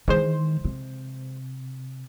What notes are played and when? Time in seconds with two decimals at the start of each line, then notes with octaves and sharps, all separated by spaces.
0.08 D#3 E3 G#3 C5
0.65 C3